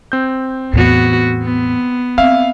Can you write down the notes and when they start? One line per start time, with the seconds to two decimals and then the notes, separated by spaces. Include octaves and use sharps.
0.12 C4 G6
0.73 E2 A2 B3 F#4
1.43 B3
2.18 C4 E5 F5